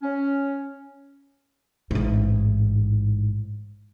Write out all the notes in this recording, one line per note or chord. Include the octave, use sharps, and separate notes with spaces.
C#4
A1 G#2